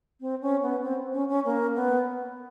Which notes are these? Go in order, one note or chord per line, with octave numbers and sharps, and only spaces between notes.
C4
C#4
B3
C4
C#4
C#4
A#3
B3